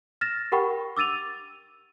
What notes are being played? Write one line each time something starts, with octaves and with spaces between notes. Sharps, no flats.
F6 A6 A#6 E7
G4 A#4 F#5 G5 B5 C#6
D6 E6 A6 D#7 F7